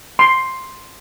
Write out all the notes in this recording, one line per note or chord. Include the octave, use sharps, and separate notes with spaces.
C6